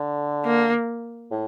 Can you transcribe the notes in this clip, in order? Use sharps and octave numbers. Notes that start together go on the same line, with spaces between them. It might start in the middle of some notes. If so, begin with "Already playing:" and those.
Already playing: D3
A#3
A2